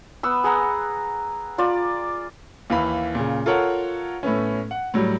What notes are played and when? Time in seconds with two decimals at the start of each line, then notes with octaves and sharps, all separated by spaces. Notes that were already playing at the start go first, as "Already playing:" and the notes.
0.23 B3 F#5 E6
0.44 G#4 F#5 A#5
1.58 F4 D5
2.70 D#2 E3 F5 B5
3.15 A#2 C#3
3.46 F4 A4 A#4 C#5 F#5
4.23 A2 A3 B3 C#4
4.71 F#5
4.94 A2 F#3 G3